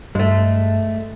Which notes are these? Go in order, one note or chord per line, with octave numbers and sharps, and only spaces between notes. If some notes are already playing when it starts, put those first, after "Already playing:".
G2 G#3 A3